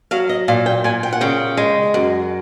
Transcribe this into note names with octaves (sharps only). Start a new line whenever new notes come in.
F#3 F5
D#5
A#2 F5
G5
A#2 G#5
G5
F#5
C#3 G5
G#3
F#2